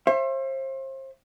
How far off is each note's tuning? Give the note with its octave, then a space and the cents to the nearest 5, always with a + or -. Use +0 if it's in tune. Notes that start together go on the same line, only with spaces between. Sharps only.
C5 +35 E5 +35